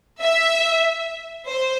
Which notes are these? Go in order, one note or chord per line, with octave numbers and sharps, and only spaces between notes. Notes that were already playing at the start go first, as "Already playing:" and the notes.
E5
C5